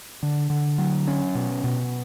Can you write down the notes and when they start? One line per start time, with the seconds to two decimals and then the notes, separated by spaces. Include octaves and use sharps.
0.23 D3
0.50 D3
0.78 F#3
1.08 C#4
1.35 B2
1.64 B2